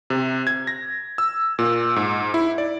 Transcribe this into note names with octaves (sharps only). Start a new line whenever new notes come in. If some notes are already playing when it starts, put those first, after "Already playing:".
C3
G#6
A#6
E6
A#2
G#2
E4
D5